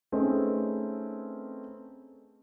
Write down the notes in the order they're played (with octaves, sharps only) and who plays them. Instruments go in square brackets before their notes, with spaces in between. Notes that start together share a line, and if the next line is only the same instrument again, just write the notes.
[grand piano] A3 C4 C#4 D#4 G#4 B4